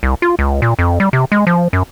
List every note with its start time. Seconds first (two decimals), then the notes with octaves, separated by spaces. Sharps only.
0.03 C2
0.22 F4
0.39 C#2
0.62 A#2
0.79 F2
1.00 G3
1.13 C3
1.32 G#3
1.47 F3
1.73 F#2